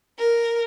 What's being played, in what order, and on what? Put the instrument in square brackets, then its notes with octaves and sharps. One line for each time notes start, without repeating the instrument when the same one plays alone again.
[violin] A#4